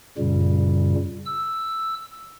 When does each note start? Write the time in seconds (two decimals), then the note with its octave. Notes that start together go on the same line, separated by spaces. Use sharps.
0.18 F#2 A#2 C#3 G3
1.26 E6